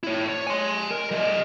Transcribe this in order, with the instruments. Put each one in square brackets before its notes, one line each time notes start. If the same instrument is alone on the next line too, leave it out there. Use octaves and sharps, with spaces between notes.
[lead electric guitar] E4 C#5
C#5
G#5 C6
A#4
G3 D#5